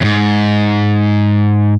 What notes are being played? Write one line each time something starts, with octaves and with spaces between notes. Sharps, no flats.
E2 G#2